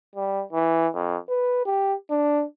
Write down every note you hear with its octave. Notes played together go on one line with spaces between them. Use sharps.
G3
E3
F2
B4
G4
D4